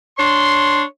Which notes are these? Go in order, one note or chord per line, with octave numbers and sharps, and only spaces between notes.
D4 C#5 C6